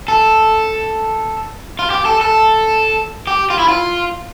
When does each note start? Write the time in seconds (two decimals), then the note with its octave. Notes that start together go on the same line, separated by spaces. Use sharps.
0.08 A4
1.79 F4
1.90 G4
2.05 A4
2.21 A4
3.27 G4
3.50 F4
3.59 E4
3.68 F4